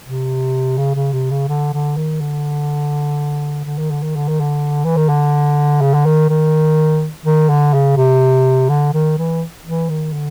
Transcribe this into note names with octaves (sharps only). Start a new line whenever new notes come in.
C3
C#3
C#3
C3
C#3
D3
D3
D#3
D3
D3
D#3
D3
D#3
D3
D#3
D3
E3
D#3
D3
C#3
D3
D#3
D#3
D#3
D3
C#3
C3
D3
D#3
E3
E3
D#3
D3